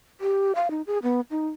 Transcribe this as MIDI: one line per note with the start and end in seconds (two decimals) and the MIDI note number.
0.21 0.52 67
0.55 0.68 77
0.70 0.82 63
0.87 0.98 68
1.03 1.21 59
1.31 1.48 63